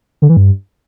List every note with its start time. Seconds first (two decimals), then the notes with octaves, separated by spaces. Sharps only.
0.22 D3
0.29 E3
0.37 G2